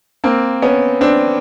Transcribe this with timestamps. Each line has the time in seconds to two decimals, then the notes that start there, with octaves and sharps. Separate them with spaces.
0.24 A#3 C4
0.62 B3 C#4
1.01 C4 D4